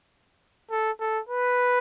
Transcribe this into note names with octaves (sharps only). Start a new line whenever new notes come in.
A4
A4
B4